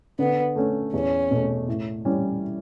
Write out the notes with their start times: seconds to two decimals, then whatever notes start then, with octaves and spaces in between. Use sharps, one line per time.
0.19 D3 B3
0.56 A3 C#4
0.93 E2 C#4
1.31 B2 A3
1.68 A2
2.05 E3 G3 C#4